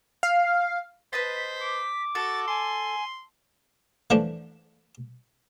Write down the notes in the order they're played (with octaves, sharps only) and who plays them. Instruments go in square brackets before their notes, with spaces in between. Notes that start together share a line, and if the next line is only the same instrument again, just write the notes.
[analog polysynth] F5
[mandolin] B4 D#5 A5 [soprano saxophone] C5 [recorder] B6
[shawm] D6
[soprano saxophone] F#4 [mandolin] A4 [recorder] A6
[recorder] G#5 [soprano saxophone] C6
[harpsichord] E3 F3 A3 D4